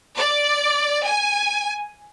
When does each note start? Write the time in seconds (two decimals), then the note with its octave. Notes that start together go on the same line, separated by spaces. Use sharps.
0.18 D5
1.05 G#5